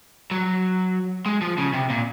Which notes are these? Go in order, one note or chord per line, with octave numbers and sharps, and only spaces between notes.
F#3
G#3
F3
C#3
C3
A#2